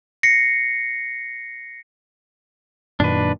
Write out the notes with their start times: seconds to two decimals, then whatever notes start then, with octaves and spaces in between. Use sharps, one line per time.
0.23 A#6 C7 C#7
3.00 F#2 A#2 D#3 D4 B4